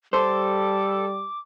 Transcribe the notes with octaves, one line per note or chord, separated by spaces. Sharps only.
G3 A4 C5 D6